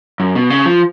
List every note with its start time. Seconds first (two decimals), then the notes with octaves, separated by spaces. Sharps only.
0.20 F#2
0.35 B2
0.50 C#3
0.66 F3